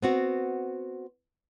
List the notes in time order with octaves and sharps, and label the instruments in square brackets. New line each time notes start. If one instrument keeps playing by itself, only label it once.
[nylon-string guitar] B3 C4 F#4